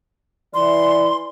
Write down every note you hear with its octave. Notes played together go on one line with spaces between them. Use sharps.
E3 D5 C6